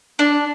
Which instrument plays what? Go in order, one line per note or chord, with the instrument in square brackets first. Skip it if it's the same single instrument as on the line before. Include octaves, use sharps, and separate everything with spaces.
[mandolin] D4